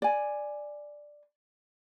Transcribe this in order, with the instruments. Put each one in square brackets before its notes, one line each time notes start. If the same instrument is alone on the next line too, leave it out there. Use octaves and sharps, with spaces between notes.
[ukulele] D5 G#5